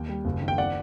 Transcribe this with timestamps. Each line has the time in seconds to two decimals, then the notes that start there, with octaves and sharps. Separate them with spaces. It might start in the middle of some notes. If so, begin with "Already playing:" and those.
Already playing: D#2 G5
0.09 G3
0.25 F#1
0.41 D#3
0.48 G5
0.58 D5 F#5